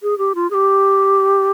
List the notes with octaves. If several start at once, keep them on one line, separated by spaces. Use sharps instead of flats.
G#4
G4
F4
G#4
G4